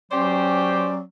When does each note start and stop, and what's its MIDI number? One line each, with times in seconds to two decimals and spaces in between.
0.12 1.04 54
0.12 0.96 61
0.12 0.94 67
0.12 0.94 72
0.12 0.99 74